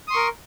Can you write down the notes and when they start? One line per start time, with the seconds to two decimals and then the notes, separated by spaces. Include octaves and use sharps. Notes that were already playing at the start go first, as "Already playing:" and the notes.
0.08 D#6
0.10 C6
0.13 C#6
0.16 A#4